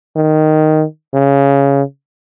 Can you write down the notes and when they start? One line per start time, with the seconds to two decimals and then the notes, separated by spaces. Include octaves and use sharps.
0.16 D#3
1.14 C#3